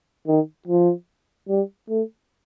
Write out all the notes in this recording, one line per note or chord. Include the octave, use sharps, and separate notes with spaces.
D#3
F3
G3
A3